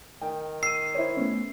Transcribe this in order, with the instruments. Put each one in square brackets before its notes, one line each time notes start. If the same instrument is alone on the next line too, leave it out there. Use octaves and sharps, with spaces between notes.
[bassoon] D#3 [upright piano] G5
[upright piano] E6 D#7 [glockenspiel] C7
[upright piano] E4 C5 C#5
[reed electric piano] A3 B3 C#4